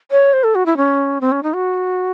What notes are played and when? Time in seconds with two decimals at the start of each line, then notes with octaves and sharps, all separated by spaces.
0.11 C#5
0.33 C5
0.44 A4
0.55 F#4
0.66 E4
0.77 C#4
1.21 C4
1.32 C#4
1.43 D#4
1.54 F#4